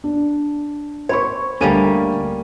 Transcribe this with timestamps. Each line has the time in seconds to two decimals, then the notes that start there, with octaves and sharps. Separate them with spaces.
0.04 D4
1.09 C5 C#5 B5 C#6
1.61 D2 G3 A#3 C#4 A4 D#7